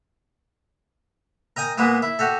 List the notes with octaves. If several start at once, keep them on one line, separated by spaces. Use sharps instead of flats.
A#4 D#5 G5 G#5
A#2 G#3 A#3 B3
E4
F#4 G4 A4